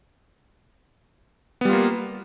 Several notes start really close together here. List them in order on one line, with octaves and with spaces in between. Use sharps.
B3 G3 F4 A#3